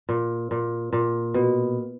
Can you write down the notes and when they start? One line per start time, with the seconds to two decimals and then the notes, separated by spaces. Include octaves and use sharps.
0.09 A#2
0.51 A#2
0.93 A#2
1.34 B2